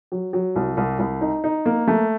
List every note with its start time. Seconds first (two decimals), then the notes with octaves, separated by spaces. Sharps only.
0.12 F#3
0.33 F#3
0.56 C2
0.77 C2
0.99 C2
1.21 D#4
1.44 D#4
1.66 A#3
1.88 A3